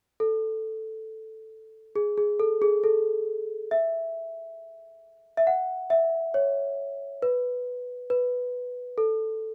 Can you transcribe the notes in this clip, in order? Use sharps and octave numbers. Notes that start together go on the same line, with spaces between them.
A4
G#4
G#4
A4
G#4
A4
E5
E5
F#5
E5
C#5
B4
B4
A4